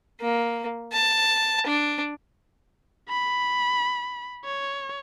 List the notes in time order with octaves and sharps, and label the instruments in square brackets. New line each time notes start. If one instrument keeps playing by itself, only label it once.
[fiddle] A#3
A5
D4
[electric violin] B5
C#5